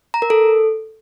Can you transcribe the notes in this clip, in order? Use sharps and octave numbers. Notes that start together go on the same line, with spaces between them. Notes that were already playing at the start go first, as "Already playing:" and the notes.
A#5
A#4
A4